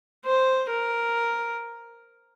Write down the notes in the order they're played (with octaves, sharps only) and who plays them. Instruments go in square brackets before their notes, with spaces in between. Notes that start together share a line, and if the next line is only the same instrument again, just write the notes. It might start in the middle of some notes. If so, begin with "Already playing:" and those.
[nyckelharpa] C5
A#4